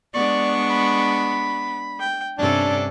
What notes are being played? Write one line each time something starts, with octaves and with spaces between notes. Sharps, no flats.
G#3 B3 D4 D5 C#6
B5
G5
G2 C3 C#4 D4 A4